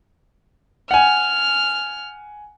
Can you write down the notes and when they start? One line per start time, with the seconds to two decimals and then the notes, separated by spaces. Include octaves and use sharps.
0.91 F#5 G#5 F6